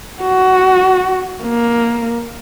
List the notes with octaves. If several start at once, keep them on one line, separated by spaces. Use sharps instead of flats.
F#4
A#3